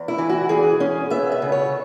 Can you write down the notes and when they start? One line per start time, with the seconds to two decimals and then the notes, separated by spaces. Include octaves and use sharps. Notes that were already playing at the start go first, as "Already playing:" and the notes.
Already playing: E2
0.08 E4
0.18 E3
0.29 F#4
0.49 E2 G#4
0.80 C#4
1.10 B3 E5
1.32 E5
1.42 C#3
1.52 C#5